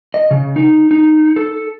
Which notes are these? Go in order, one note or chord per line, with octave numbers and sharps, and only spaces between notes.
D#5
C#3
D#4
D#4
A4